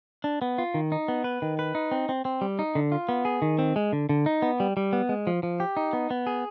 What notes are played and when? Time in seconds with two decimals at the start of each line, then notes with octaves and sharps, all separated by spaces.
0.24 D4
0.42 B3
0.58 F4
0.74 D#3
0.92 D#4
1.08 B3
1.24 B4
1.42 D#3
1.59 B4
1.75 D#4
1.92 C4
2.09 C4
2.25 C4
2.41 G3
2.59 D#4
2.75 D3
2.92 F4
3.09 B3
3.25 G#4
3.42 D#3
3.59 C4
3.76 G#3
3.93 D3
4.09 D3
4.26 D#4
4.42 B3
4.60 G3
4.77 G3
4.93 B3
5.09 G#3
5.27 F3
5.43 F3
5.60 G4
5.77 D#4
5.93 B3
6.11 B3
6.27 G#4